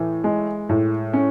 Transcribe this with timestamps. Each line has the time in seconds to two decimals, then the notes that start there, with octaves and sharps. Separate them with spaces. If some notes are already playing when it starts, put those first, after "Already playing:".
Already playing: A2 E3
0.24 G#3
0.69 A2
1.13 C#4